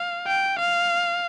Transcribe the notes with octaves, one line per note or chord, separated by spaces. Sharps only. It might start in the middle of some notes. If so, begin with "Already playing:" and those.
Already playing: F5
G5
F5